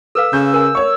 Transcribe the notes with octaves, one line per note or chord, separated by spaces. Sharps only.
A4 B4 F5 E6
C#3 G6
A#4 G#5
C#5 D5 C#6